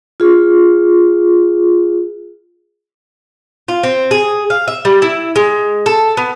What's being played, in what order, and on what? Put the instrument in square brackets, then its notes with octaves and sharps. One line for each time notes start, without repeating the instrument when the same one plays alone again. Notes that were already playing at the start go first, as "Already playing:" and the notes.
[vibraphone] F4 G#4
[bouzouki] F4
C4
G#4
F5
E5
G3
E4
G#3
A4
B3